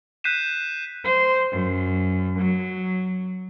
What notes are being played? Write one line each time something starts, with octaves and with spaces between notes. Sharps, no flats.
F#6 G6 B6 C7 D#7 E7
C5
F#2
F#3